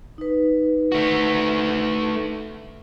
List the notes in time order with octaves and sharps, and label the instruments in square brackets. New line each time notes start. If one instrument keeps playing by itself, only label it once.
[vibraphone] D#4 B4
[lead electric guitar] A3 F#4